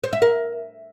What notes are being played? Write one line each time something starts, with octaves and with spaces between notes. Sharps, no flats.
C5
E5
A#4